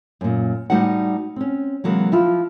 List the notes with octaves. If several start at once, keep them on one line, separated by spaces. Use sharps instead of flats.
F#2 A#2
A2 G3 D#4 F#4 C5 F#5
C4 C#4
C3 E3 F#3 G#3 A#3
F3 E4 F4